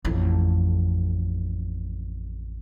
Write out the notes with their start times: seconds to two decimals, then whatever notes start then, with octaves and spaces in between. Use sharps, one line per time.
0.05 A1 F2